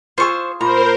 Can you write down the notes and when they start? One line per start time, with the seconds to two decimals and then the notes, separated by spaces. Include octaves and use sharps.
0.18 F4 G#4 C5 C#6 E6
0.61 A#2 A#4 C5 A#5 B5